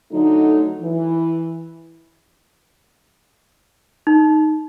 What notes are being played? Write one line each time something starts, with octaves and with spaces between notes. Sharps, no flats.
D3 F#3 A3 D#4
E3
D#4